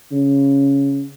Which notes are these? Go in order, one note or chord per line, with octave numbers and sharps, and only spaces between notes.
C#3